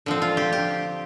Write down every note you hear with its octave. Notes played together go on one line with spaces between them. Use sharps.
D3 F3 C4
F4
G4
G4